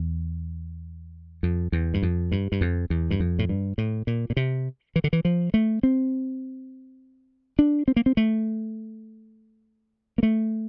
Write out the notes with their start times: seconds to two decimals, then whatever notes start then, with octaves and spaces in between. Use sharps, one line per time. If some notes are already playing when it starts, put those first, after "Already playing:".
Already playing: E2
1.43 F2
1.72 E2
1.94 G2
2.02 F2
2.32 G2
2.52 G2
2.61 F2
2.90 E2
3.11 G2
3.20 F2
3.39 A2
3.49 G2
3.78 A2
4.07 A#2
4.30 A#2
4.37 C3
4.96 E3
5.04 D3
5.13 E3
5.25 F3
5.54 A3
5.83 C4
7.59 D4
7.88 C4
7.96 A#3
8.06 C4
8.17 A3
10.18 A#3
10.23 A3